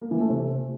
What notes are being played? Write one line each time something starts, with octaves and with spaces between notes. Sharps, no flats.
A#3
E3
A3
C3